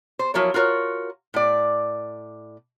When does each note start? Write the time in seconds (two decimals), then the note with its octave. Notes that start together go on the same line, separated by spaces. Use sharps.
0.19 C5
0.34 F3 F#3 E4 A#4 C#5
0.54 F4 F#4 A#4 C#5
1.34 A2 D5